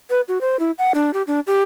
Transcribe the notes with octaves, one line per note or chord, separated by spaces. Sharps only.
B4
F#4
C5
E4
F#5
D4
G4
D4
G4